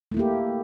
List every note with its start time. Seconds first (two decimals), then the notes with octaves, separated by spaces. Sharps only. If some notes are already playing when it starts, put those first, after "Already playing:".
0.12 A3
0.14 E4
0.17 A#3
0.19 G4